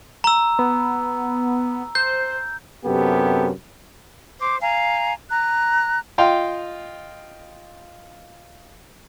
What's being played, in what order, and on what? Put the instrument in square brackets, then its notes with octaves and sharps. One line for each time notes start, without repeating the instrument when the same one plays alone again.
[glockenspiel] A#5 E6
[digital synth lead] B3
[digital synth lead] C5 [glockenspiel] G6
[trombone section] F#2 C3 B3 G4 A4
[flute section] C5 D6
F5 G#5 A#5
A#5 F#6
[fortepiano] F4 D#5 F5 G5 C6